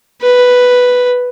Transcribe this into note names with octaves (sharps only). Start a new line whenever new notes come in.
B4